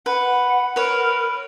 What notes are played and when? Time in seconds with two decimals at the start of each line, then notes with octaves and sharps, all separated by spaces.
0.06 B4 F#5
0.76 A#4 B4 C#5